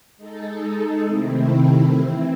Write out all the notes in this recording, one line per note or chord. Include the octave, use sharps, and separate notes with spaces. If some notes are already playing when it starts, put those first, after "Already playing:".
G#3 D#4 A4
C3 D#3 A3 C4 E4
E3 C4 E4